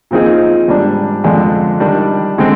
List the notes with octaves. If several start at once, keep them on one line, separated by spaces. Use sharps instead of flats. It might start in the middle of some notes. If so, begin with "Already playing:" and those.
A#2 F3 C4 D#4 G#4
G#2 G3 D4
F2 D3 G#3 D4
D#3 G3 D4
D3 G#3 C4